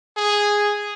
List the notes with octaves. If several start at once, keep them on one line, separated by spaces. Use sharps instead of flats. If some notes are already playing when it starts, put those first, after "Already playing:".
G#4